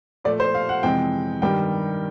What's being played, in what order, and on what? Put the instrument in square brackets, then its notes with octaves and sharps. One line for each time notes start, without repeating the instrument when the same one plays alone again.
[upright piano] A#2 F3 A3 D5
C5
F5
F#5
F2 C3 E3 G#3 G5
G2 D#3 G3 G5